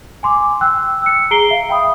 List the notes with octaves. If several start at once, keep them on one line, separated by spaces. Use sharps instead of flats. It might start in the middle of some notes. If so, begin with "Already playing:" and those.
G#5 C6 D6
G5 E6 F#6
E6 C#7
G#4 A#5 C7 D7 G7
E5 F5
F5 G5 B5 D#6